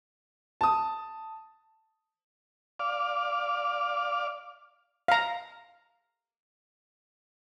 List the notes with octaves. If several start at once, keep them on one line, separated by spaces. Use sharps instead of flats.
A5 D#6
D5 F5
F5 A#5